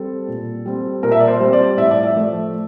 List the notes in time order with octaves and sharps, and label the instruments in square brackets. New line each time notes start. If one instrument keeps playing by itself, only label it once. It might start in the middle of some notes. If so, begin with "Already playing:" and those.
Already playing: [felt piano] G3 C4 A4
A#2
G3 C4
A#2 A#4
E5
D5
C5
G3 C4
D5
A2 E5
D5
E5
F3 A3